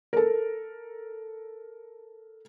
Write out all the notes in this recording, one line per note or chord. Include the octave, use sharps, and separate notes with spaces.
A4 A#4